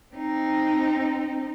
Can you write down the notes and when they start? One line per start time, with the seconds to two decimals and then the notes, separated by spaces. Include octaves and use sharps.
0.15 C4 D#4